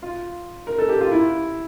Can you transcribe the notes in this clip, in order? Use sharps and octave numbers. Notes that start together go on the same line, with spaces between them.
F4
A#4
A4
G4
F4
E4